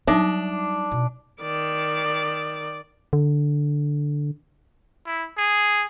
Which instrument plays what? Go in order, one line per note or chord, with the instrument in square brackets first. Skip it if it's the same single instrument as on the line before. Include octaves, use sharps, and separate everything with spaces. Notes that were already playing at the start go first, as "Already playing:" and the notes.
[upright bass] F#3 G3 [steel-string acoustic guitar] D4 [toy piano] D#4 E5 D#6
[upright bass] B2
[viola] D#3 D5
[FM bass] D3
[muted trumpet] E4
G#4